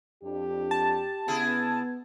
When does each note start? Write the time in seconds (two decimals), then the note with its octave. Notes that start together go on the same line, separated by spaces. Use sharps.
0.23 F2 D4 G4
0.71 A5
1.28 C#3 B3 E4 G#4